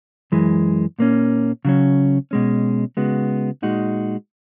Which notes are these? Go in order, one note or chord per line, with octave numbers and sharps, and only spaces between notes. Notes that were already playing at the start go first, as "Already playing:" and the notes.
F#2 E3 G#3
A#2 A#3 C#4
C#3 F#3 C#4
B2 G#3 C#4
C#3 G#3 B3 F#4
A#2 G#3 D#4 F#4